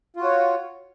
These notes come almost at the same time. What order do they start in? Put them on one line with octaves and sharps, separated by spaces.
F4 F#4 C#5